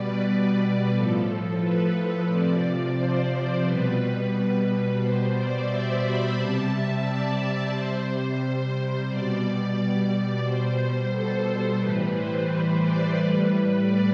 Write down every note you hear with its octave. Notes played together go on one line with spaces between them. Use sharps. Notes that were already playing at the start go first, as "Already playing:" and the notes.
Already playing: B2 G3 B4 D5
B4
A2 F3 A4
B4
C3 F3 D5
C5
B2 G3 B4
B4
B2 G3 C5
D5
E5
B5
C3 G3 A5
E5
D5
C3 G3 C5
B2 G3 D5
B2 G3 C5
A4
A2 E3 G3 B4
C5
C5
D5
A2 G3 B4
D5